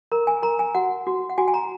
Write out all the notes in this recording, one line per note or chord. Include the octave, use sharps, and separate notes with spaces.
A#4 A#5
G#5
A#4 A#5
G#5
F#4 F#5
F#4
F#5
F#4 G#5
G#5
A#5